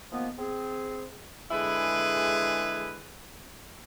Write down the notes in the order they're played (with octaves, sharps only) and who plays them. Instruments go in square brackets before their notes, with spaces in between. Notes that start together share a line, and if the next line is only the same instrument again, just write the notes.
[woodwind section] D#3 F3 A#3 B3
C4 G#4
[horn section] D3 G#3 E4 G#4 B4